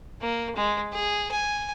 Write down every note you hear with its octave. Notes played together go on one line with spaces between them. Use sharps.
A#3
G#3
G#4
G#5